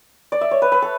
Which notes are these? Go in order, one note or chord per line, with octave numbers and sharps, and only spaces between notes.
D5
E5
C#5
B4
B4
A4